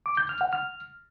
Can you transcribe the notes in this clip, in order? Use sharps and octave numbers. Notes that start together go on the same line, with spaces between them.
D6
G6
F6
F#5
F6